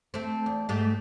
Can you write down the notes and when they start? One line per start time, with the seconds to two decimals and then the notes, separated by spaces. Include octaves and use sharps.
0.14 A3 C4
0.46 E2
0.69 G#2 A3 G4